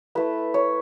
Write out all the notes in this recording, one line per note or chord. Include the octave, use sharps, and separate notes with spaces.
A3 E4 B4
C#5